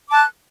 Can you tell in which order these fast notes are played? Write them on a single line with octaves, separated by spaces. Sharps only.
D6 A5 F#6